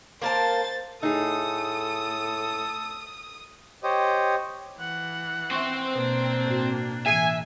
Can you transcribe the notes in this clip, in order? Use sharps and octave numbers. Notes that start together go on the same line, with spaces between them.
A#3 A#4 C5 A5 A6
A2 D#4 G#4 A4 D#6
G4 C5 C#5 D#5
E3 F#5
C4 C5 E5 C#6
B2 A#3 D4
A2 F#4
A2 E3 E5 G#5